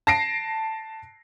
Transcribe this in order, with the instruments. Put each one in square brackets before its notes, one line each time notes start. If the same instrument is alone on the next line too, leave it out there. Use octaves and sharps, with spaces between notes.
[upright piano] A5 A#6 C7 D7